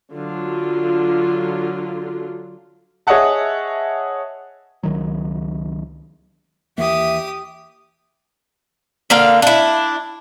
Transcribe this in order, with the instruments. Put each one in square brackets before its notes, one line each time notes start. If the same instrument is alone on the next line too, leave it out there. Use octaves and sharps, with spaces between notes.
[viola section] D3 F#3 F4
[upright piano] G#4 C#5 D#5 E5 F#5 A5
[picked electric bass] C#2 D#3 F#3
[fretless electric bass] D#2 E3 A#3 [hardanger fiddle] G4 D#6 [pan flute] E5
[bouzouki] D3 A#3 F5
D4 E4